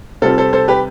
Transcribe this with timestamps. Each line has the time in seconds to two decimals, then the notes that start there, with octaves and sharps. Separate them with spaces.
0.22 C3 G3 C4 F4 A4
0.38 A4 C5
0.53 A4 C5
0.68 G4 B4